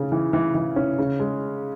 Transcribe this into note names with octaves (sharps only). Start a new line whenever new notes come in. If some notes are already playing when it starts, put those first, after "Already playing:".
Already playing: C#3 C#4
E3
E3
E3
C#4
C#3
G#3